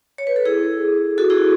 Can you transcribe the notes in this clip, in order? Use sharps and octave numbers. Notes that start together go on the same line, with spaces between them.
C#5
B4
A4
E4 G#4
F#4 A4
E4 G#4